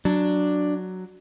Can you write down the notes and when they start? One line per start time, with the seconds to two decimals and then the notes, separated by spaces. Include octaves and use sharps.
0.05 F#3 D4